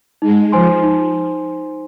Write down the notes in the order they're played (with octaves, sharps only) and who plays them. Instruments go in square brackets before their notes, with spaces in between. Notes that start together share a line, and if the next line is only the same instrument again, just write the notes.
[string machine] G#3 [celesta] D#4
[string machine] F3 [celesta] C5 G#5 C6
[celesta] D#4